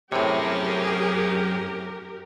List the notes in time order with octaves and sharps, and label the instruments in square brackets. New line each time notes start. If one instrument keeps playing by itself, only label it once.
[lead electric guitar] F#2 C#5 [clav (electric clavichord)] A2 C3 [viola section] G4 A#4 [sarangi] G#4